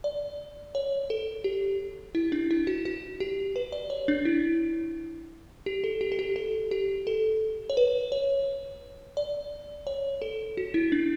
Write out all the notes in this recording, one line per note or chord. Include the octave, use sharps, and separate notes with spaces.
D5
C#5
A4
G4
E4
D4
E4
F#4
F#4
G4
B4
D5
C#5
D4
E4
G4
A4
G4
A4
G4
A4
G4
A4
C#5
B4
C#5
D5
C#5
A4
F#4
E4
D4